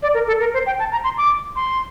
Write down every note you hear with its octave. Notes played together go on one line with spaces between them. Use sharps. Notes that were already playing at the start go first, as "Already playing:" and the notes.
D5
A#4
A4
A#4
C5
G5
A5
A#5
C6
D6
C6